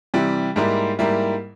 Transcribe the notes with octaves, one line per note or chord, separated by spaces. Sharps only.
C3 E3 G3
G#2 G3 A#3 E4
G#2 G3 A#3 E4